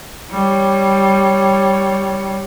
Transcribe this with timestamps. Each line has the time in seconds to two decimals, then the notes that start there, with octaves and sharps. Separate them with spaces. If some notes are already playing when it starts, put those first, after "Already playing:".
0.31 G3 C#5